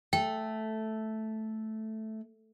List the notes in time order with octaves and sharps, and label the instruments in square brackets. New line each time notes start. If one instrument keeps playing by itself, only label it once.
[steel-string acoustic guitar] A3 [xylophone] G5